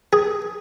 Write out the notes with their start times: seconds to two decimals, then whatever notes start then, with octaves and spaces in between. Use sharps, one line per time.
0.13 G#4